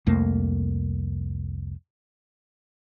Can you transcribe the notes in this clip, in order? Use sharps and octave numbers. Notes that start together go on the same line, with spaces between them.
C2 F2 A3 A#3